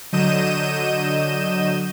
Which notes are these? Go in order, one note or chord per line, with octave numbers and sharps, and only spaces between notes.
D3 F#3 D#5 G6 D#7 E7